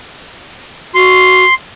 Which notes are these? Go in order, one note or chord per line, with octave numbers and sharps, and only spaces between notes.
F#4 C6